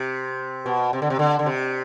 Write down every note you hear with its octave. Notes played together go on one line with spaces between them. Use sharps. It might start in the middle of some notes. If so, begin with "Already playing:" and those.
Already playing: C3
B2
C3
D3
C3
D3
D3
C3